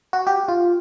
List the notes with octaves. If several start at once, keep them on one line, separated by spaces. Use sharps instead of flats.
F#4
G4
F4